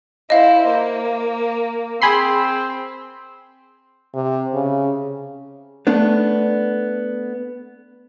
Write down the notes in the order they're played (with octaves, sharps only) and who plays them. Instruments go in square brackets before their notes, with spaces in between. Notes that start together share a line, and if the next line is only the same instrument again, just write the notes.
[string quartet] E4 C5 [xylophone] D#5 F5
[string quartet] A#3
[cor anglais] C4 [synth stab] G#4 B5 C6
[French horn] C3
C#3
[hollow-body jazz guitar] A3 B3 D4